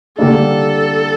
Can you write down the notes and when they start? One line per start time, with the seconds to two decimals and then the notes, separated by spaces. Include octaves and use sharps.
0.18 D3 G3 A#3 D4 A4